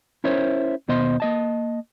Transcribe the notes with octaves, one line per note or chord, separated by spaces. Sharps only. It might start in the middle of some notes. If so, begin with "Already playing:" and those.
C#4 E4 A#4 C5 C#5
D#2 B2 B3 C5 D#5 C6
A#3 D#5 A5